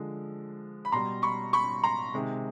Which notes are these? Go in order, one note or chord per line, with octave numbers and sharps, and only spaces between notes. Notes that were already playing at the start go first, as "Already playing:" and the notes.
Already playing: D3 F3 G#3
B5
B2 G3 A#5 C6
B5 C#6
B5 C#6
A#5 C6
C3 D#3 G#3